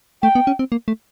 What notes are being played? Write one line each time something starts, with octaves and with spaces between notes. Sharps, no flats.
A3 G5
B3
C#4
C4
A#3
A3